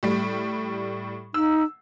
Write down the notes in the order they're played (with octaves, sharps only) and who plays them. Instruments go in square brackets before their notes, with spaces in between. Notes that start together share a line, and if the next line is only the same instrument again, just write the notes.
[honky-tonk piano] A2 G3
[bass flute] D#4 [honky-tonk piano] E6